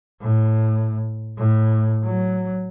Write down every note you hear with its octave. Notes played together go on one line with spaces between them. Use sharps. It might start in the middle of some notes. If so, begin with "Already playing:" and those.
A2
A2
F#3